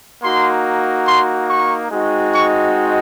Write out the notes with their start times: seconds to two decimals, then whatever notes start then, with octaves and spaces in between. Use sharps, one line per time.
0.22 A#3 D#4 F#4 C6
1.07 C6
1.49 C#6
1.91 G#3 C4 D#4 F#4
2.33 C#6